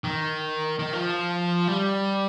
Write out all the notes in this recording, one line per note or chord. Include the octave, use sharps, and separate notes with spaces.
D#3
D#3
F3
G3